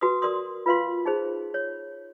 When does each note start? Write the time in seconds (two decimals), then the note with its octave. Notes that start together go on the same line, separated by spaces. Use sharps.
0.01 F#4 B4 D#6
0.22 A#4 D5 C6 D#6
0.66 F4 B4 F5 C6
1.06 D#4 G#4 C5
1.54 C#5